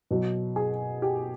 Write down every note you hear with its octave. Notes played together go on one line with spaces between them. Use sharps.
B2 F#3
G#4
G4